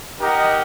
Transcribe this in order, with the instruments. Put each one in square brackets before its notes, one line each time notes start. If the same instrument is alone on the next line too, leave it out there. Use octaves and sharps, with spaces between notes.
[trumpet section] D#4 G4 A#4 D#5 F#5